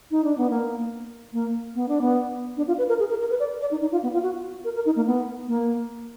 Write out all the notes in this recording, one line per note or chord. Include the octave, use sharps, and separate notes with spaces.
D#4
D4
B3
A#3
A#3
B3
D4
B3
D4
F4
B4
A#4
G#4
A#4
A#4
B4
D5
D5
D#4
D#4
F4
B3
F4
F#4
A#4
A#4
D#4
A#3
B3
A#3